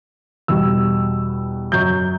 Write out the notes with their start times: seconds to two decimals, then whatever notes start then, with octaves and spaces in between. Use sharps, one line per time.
0.48 E2 B2 G3 E6
1.72 F#2 F#3 G6